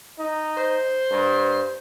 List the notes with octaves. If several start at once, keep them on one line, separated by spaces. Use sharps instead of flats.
D#4
C5
G2